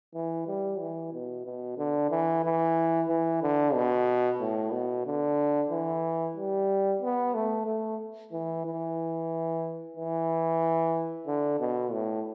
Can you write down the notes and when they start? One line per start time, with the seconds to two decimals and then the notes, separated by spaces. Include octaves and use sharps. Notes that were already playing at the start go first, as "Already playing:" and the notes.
0.15 E3
0.47 G3
0.80 E3
1.13 B2
1.45 B2
1.78 D3
2.10 E3
2.44 E3
3.09 E3
3.42 D3
3.74 B2
4.40 A2
4.72 B2
5.06 D3
5.70 E3
6.36 G3
7.02 B3
7.34 A3
7.67 A3
8.32 E3
8.65 E3
9.96 E3
11.27 D3
11.60 B2
11.92 A2